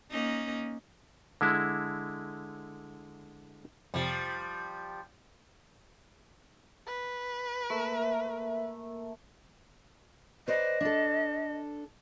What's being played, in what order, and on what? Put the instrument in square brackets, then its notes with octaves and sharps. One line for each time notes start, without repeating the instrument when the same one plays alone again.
[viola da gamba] A#3 C#4 D#4
[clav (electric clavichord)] D3 G#3 E4
[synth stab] F2 C3 [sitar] F3 G3
[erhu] B4
[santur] A3 [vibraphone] A#3 A#4 E5
[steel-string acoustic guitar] B4 C5 D5 [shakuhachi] D#5
[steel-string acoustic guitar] D4 A4